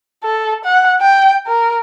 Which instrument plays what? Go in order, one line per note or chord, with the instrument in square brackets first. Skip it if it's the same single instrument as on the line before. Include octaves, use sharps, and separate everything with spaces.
[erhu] A4
F#5
G5
A#4